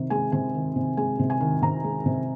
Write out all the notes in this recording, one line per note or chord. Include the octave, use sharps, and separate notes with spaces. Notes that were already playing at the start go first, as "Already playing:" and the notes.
Already playing: C3 D#3
G#3 G#5
C3 G#5
D#3
C3
G#3 G#5
C3
G#5
D#3
C3 A#5
G#3
C3